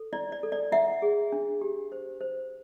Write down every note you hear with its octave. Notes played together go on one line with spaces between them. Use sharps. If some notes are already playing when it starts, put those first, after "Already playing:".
Already playing: A4
E4 D5
D5
A4
D5
E4 E5 F#5
G#4
D4
G4
C5
C5